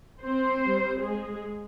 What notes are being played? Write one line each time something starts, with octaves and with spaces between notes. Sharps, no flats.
C4 C5
G3 C4
G#3 G#4